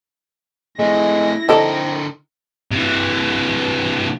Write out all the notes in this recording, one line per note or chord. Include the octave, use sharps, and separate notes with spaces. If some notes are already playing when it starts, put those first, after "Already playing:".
G#3 A3 C4 E4 A#6
D3 C4 D#4 A4 A#4 D5
C3 E3